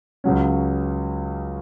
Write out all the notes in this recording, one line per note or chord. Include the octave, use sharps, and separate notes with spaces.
C#2 C#3 F#3 C#4